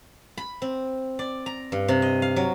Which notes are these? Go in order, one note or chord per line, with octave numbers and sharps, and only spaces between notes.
B5
C4
D5
A#5
G2
C3
D#5
F5
F#3